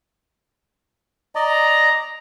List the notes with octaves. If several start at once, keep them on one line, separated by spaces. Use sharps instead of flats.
D5 D#5 A#5